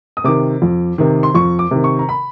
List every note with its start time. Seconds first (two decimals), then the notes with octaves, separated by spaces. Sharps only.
0.17 D#6
0.24 C3 D#3 D6
0.62 F2
0.98 C3 D#3
1.23 C6
1.35 F2 C#6
1.59 D6
1.71 C3 D#3
1.84 C#6
1.99 A#5
2.09 B5